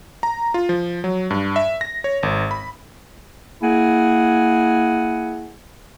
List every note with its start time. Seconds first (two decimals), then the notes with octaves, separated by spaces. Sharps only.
0.23 A#5
0.54 F4
0.69 F3
1.04 F#3
1.31 G2
1.56 E5
1.81 A#6
2.04 C#5
2.23 G#1
2.51 B5
3.62 A#3 E4 G#4 F#5 G#5